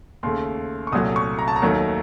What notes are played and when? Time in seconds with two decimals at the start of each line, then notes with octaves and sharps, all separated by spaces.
0.23 D#2 C#3 A3 C6
0.87 C#6
0.92 C2 A#2 F#3 A3 D#6
1.16 C#6
1.39 A#5
1.48 A5
1.56 A#5
1.62 D#2 D#3 F#3 A3